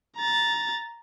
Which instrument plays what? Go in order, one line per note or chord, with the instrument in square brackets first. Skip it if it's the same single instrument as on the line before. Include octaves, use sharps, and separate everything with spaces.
[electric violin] A#5 A6